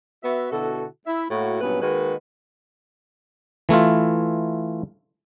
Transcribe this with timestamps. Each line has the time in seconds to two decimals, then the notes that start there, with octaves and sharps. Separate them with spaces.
0.24 B3 F#4 E5
0.52 B2 D3 E4 F#4 A4
1.07 E4 E5
1.30 A2 A#3 E4 F#4
1.61 G2 A#2 F#3 B3 C#4 B4
1.82 D#3 G#3 A#3 F#4 B4
3.69 E3 A3 E4 F4